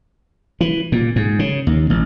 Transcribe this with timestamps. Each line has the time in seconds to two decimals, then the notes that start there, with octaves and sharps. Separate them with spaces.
0.61 E3
0.92 A#2
1.16 G#2
1.39 C#3
1.67 D#2
1.90 A1